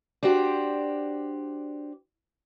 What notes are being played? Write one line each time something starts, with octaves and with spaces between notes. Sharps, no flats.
D4 F#4 G4 C5 D5